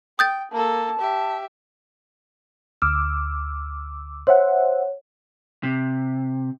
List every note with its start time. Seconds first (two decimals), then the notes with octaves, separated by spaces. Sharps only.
0.19 G5 D#6 G6 A6
0.52 A#3 A4 A5
1.00 G4 E5
2.82 D2 D6 E6 F6
4.27 C5 C#5 E5 F#5
5.63 C3